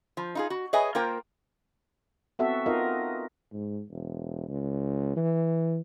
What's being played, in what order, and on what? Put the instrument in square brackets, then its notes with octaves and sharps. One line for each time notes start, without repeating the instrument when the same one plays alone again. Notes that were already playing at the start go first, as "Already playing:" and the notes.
[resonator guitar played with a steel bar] F3
D#4 F4 G#4
F#4
G#4 B4 C#5 D#5 E5 G#5
A#3 F4 A#4 C5 G5
[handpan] B3 C4 F#4 A4 E5
B3 D#4 F4 A#4 D#5 F5
[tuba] G#2
E1
C#2
E3